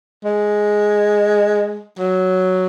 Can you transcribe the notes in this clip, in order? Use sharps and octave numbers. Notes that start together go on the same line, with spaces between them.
G#3
F#3